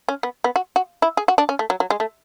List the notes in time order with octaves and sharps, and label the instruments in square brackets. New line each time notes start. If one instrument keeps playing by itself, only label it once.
[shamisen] C#4
B3
B3
F#4
F#4
E4
G#4
F#4
D4
C#4
A3
F#3
F#3
G#3
A3